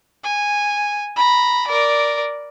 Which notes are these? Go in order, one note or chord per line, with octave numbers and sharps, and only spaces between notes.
G#5
A#5 B5
A#4 D5